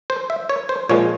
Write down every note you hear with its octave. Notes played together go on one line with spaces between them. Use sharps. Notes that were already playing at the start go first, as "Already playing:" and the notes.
C5
E5
C#5
C5
A#2 F3 G#3 C#5